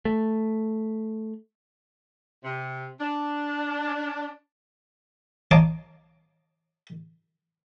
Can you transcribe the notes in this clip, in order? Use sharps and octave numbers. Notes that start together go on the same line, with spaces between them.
A3
C3
D4
C#5 D#5 F5 A5 A#5 D6